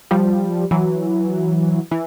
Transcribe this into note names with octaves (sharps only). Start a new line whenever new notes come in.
F3 G3
E3 F#3
E3